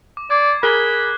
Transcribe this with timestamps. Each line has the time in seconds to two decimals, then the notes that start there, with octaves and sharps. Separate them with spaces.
0.17 D6
0.30 D5 D6 G#6 C7
0.63 G#4 A#4 B5 F#6 G7